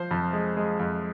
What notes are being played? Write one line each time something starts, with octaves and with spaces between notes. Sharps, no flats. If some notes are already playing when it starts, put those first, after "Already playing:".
Already playing: F3 C5
F2
G#3
G#3
F2